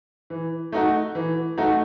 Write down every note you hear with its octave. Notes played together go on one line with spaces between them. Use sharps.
E3
A3 D#4 F#4
E3
A3 D#4 F#4